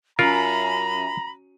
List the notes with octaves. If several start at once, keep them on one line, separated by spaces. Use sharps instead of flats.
F#2 F4 A#4 A#5 B5